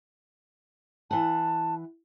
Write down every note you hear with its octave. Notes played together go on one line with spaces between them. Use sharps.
E3 F#5 A5